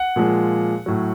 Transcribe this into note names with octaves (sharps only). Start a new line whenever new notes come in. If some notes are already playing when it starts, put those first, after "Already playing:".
Already playing: F#5
A#2 F3 G#3
A2 F#3